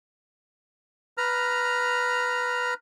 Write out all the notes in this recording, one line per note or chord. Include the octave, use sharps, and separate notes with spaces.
B4 A#5 F6